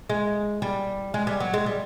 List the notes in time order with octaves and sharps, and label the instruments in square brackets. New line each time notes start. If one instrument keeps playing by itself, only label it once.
[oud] G#3
G3
G#3
G3
F#3
G#3
G3